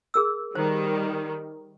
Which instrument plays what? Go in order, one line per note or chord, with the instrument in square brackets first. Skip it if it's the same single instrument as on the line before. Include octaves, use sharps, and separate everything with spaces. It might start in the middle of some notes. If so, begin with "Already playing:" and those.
[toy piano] G#4 A#4 E6
[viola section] D#3 G3 [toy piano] C5